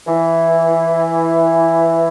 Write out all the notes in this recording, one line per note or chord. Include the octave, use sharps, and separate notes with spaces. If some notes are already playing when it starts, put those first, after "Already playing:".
E3